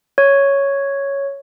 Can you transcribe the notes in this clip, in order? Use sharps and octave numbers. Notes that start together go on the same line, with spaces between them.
C#5